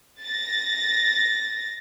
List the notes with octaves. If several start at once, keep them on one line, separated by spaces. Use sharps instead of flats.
A6 A#6